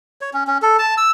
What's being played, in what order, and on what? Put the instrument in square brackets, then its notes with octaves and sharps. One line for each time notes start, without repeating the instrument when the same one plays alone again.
[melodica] C#5
C#4
C#4
A4
A5
E6